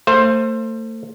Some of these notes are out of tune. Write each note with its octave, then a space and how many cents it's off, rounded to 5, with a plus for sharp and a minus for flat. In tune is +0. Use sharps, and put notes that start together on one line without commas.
A3 +35 C5 +15 F5 -45